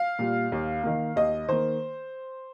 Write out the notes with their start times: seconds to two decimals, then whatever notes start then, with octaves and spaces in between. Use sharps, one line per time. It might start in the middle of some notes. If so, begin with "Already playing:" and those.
Already playing: F5
0.19 A#2 G3
0.52 D#2
0.84 D#3 A#3
1.16 D#2 D#5
1.49 D#3 A#3 C5